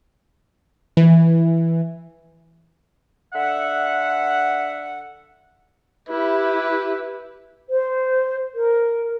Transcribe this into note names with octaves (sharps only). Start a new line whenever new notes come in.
E3
D3 E5 F#5
E4 G4 B4
C5
A#4